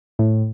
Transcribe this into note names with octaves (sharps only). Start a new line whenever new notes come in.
A2